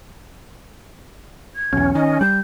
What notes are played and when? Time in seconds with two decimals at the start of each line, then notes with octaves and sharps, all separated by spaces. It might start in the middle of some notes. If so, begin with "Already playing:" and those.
1.56 G#6
1.73 B1 E2 C#4
1.95 D#3 D#5
2.21 G3 G6